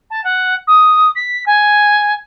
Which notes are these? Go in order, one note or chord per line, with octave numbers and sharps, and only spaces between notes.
A5
F#5
D#6
B6
G#5